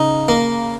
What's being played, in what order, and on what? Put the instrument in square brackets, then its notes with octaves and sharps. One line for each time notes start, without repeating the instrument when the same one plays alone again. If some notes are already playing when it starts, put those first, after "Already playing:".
Already playing: [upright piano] C#3 [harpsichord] D#4
[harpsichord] A#3